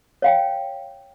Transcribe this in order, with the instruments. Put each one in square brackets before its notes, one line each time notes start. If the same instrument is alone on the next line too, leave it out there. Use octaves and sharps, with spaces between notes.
[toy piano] C#5 F5 G5